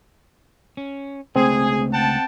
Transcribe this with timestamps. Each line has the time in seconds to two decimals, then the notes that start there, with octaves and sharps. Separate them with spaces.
0.77 C#4
1.36 C#2 A3 C4 G#4 D#5
1.93 F#5 G5 A5